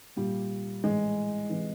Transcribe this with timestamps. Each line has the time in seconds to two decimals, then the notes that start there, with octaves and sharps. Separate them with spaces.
0.16 A#2 G3
0.84 A2 E3 G#3
1.49 C3 E3